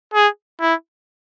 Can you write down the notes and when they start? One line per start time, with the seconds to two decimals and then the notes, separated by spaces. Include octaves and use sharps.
0.14 G#4
0.60 E4